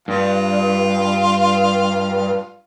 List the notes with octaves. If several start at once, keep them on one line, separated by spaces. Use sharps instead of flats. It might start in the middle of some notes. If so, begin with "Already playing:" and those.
G2 F4